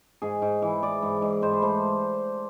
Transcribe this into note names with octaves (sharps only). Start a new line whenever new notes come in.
G#2 G#4
G#2
E3
E3 D5
G#2
G#2
G#2 C5
B4
A3 C5